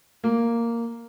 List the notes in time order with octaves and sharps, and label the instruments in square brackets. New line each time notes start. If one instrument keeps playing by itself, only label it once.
[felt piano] A#3